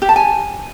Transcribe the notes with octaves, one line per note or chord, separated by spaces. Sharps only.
G4
A5
G#5